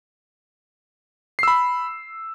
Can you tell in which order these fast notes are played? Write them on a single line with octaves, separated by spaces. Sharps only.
C7 E6 B5